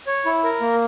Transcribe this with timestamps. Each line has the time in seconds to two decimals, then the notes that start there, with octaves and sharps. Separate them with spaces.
0.07 C#5
0.25 E4
0.44 A#4
0.61 A#3